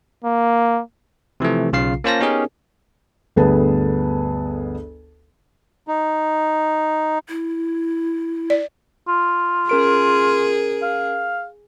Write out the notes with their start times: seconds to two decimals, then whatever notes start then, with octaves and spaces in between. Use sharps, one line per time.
0.24 A#3
1.40 C3 E3 F3 A3
1.73 B1 C#3 F4 F5 C7
2.04 A#3 C#4 F4 C5 A5 A#6
2.20 B3 C#4 D#4 G4 G#4 A#4
3.36 G1 D2 B3 G#4 B4 A5
5.88 D#4
7.28 E4
8.50 D5
9.08 F4
9.69 C#4 G#4 A#4 D7
10.82 F5